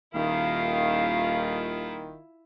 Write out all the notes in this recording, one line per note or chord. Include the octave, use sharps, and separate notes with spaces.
D#1 D#3 E4 F4 F5